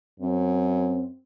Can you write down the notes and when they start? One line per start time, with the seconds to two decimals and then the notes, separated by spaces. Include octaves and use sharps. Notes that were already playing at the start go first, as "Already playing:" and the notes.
0.19 F#2 C4